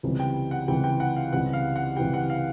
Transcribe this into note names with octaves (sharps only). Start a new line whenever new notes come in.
C#2 C3 E3 G3
G5
F#5
C#2 C3 E3 G3 G5
G5
F#5
F5
C#2 C3 E3 G3 F#5
F5
F#5
C#2 C3 E3 G3 G5
F#5
F5